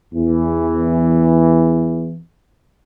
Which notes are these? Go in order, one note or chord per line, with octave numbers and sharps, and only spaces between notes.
E2 E3